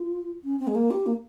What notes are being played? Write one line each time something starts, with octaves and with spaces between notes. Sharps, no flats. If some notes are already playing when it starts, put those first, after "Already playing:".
Already playing: F4
C#4
C4
G#3
A#3
G4
A#3